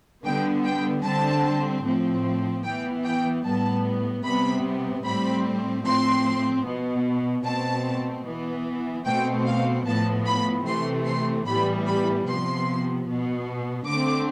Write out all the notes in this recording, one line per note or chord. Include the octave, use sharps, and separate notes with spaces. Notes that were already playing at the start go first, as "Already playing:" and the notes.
D3 G3 B3 G5
G5
D3 G3 C4 A5
A2 F3 C4
E3 B3 G5
G5
A2 G3 B3 A5
C3 G3 B3 B5
A2 G3 C4 B5
A2 F3 C4 C6
B2 B3
B2 A3 C4 A5
E3 B3
B2 A3 C4 G5
F5
A2 F3 B3 A5
B5
C3 E3 A3 C4 C6
C6
A2 E3 G3 B3 B5
B5
C3 F3 B3 C6
B2 B3
D3 A3 C4 D6